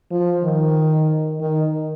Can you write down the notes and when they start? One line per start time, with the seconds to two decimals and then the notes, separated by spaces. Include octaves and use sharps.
0.11 F3
0.44 D#3
1.40 D#3